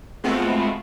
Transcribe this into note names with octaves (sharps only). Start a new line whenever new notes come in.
G#3 A3 B3 C4 F4 F#4